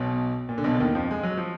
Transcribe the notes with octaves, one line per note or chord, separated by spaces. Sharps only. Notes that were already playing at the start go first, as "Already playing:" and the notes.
Already playing: B1 B2
A#2
D3
B1 B2
D3
D#2 D#3
F2 F3
G#3
F#3
F3